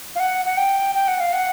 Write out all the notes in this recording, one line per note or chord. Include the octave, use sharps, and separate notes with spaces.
F5
F#5
F#5
G5
G5
F#5
F5
F#5